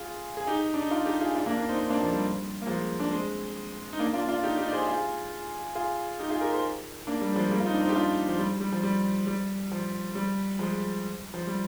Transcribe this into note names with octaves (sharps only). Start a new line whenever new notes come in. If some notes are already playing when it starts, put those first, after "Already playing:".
Already playing: F4 G#4
G#4
D#4 G4
D4
D#4
D4 F4
D#4 G4
F4 G#4
D4 F4
A#3 D4
A#3 D4
C4 D#4
C4 D#4
A#3 D4
F3
G3
A#3
F3 G#3
D4
G#3 C4
D#4
A#3 D4
D4 F4
D4 F4
D#4 G4
D#4 G4
D5
G#4 C5
F4 G#4
F4 G#4
D#4 G4
F4 G#4
G4 A#4
G#4 C5
A#3 D4
G3
G3
F3 G#3
G3 A#3
F4
C4 D#4
D4
C4 D#4
G4
D4 F4
F3
G3
G3
F3
G3
G3
F3
G3
F3 G#3
F3
G3